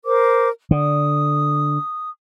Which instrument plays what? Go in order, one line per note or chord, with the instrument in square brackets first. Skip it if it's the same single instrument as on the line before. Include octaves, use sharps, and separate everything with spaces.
[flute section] A#4 C5 D6
[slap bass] D3 [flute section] D#6